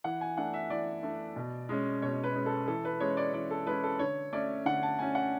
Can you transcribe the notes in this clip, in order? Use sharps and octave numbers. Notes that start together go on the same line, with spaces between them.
E3 F#5
G#5
A3 D4 F#5
E5
E3 D5
A3 D4
B2
G#3 C#4
B2 C#5
B4
G#3 C#4
A4
E3 A4
B4
G#3 C#4 C#5
D5
E3 D5
A4
G#3 C#4 B4
A4
D3 C#5
A3 C#4 D5
D3 F#5
A5
A3 C#4 G#5
F#5